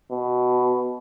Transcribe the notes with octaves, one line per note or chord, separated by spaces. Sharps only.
B2